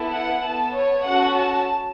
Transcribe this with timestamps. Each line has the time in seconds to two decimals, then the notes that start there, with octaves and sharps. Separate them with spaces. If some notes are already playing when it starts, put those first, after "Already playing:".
Already playing: B3 E4 A4
0.13 F#5
0.44 B3 A4 A5
0.74 C#5
1.05 C#4 F#4 A4 F#5
1.36 A5